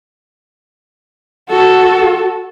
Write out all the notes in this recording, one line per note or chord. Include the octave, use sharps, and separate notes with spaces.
F#4 A4